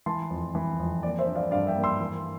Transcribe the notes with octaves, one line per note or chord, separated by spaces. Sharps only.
E3 A5 C6
F2
E3
F2
A#3 D5
C5 E5
D4
D5 F5
G2 D5 F5
E5 G5
A#3
C6 E6
E3